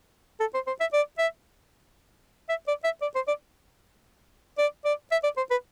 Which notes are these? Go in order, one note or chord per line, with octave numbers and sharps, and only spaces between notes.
A4
C5
C5
E5
D5
E5
E5
D5
E5
D5
C5
D5
D5
D5
E5
D5
C5
B4